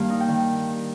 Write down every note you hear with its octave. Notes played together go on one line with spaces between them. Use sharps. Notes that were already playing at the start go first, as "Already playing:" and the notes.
Already playing: G2 D#3 A#3 F5
D#4
G5
D#3